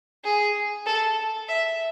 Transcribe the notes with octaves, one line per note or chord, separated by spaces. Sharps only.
G#4
A4
E5